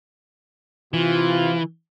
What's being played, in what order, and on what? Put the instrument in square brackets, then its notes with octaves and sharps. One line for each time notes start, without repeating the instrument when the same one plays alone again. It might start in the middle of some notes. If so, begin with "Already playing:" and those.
[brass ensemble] C3 F4 [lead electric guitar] E3